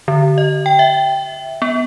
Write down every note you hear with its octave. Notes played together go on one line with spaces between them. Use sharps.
D3
D#5
G5
E5
B3